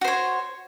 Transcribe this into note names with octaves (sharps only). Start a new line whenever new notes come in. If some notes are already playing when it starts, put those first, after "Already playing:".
F#4 C5 C#5